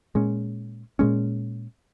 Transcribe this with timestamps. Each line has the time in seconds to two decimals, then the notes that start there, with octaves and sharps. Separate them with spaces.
0.15 A#2 G#3 C#4
0.99 A#2 G#3 C#4